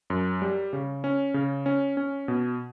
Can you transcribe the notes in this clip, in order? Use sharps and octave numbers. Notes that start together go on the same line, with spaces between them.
F#2
G3
C#3
C#4
C#3
C#4
C#4
B2